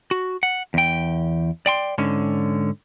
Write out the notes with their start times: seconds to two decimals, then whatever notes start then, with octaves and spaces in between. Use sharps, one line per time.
0.11 F#4
0.43 F#5
0.74 E2 G5
1.66 D5 G5 C6
1.98 G#2 D3 C#4